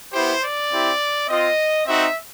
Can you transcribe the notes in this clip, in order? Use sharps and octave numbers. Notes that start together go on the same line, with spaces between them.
B3 E4 G4 C5
D5
C4 E4 G4
C4 F4 D#5
C4 D#4 F#4 E5